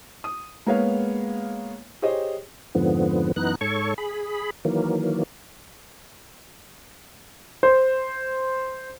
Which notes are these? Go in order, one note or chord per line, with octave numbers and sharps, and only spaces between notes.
D#6
G#3 A#3 B3 B4 C#5 F5
G4 G#4 C5 C#5 D#5
F2 G#2 D3 F3 B3
F#2 E3 B3 D#4 F#6
G#2 A4 C#5 C#6
G#4 B5
D#3 E3 F#3 A#3
C5